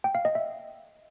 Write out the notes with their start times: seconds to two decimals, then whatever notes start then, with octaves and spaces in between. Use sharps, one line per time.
0.04 G5
0.15 F5
0.25 D#5
0.35 E5